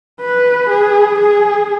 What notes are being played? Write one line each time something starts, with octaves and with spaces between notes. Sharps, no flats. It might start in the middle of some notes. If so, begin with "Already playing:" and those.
B4
G#4
G#4